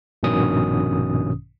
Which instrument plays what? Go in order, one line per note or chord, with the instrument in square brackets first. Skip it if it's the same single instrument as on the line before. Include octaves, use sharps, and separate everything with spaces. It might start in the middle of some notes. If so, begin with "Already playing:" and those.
[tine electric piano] A#1 G2 B2 D#3 C#4 D#6